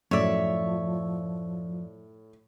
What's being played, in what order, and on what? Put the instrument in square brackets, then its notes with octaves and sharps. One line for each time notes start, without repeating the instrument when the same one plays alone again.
[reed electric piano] F#2 D5 [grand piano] A2 [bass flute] F3 [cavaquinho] C#5 E5